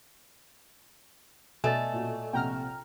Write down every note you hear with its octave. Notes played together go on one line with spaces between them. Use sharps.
B2 A3 D5 D#5 G#5 A6
A#2 F#4
A#1 C3 F#5 G5 A#5 F6